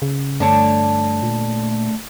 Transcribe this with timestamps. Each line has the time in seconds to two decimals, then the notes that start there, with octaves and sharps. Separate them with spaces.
0.02 C#3
0.40 G2 D3 A3 D4 C#5
1.23 A#2